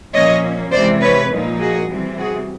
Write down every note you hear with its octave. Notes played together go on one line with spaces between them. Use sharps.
A#2 F3 A#3 C#4 C#5 D#5
C3 E3 G#3 C5 D5
B4 C#5
A#2 F3 A#3 D#4
F#4 G#4
C3 E3 G3 C4
F#4 G#4